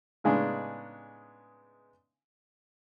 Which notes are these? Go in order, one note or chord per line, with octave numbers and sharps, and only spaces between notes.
A2 C#3 G#3 B3 D4 D#4